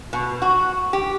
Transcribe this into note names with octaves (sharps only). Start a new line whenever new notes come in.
B2
F#4
G4